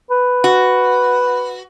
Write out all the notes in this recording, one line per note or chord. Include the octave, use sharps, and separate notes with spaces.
B4
F#4